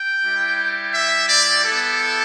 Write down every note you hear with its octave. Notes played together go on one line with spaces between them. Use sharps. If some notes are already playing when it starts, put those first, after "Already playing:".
Already playing: G5
G3 E4 G4
E5
D5
B3 E4 G4 A4